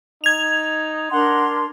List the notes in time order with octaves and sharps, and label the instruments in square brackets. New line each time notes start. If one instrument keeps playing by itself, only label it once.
[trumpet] D#4 [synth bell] G#6 F7
[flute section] D4 A#4 C6 [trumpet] F#5